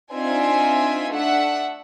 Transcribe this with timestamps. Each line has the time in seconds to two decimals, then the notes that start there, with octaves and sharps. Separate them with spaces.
0.13 C4 D4 D#4 F4 E5 G#5
1.11 A3 D4 E5 F#5